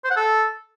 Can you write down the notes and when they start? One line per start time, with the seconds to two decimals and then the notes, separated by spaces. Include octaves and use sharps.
0.05 C5
0.11 F#5
0.17 A4